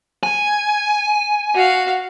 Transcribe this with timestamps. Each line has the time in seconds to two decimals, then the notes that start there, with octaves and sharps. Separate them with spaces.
0.23 G#5
1.55 F#4 F5